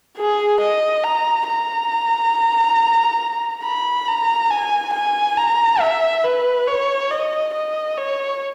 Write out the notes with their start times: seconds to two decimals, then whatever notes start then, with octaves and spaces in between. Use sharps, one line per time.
0.17 G#4
0.61 D#5
1.04 A#5
1.48 A#5
3.64 B5
4.07 A#5
4.50 G#5
4.93 G#5
5.37 A#5
5.80 E5
6.24 B4
6.67 C#5
7.11 D#5
7.53 D#5
7.97 C#5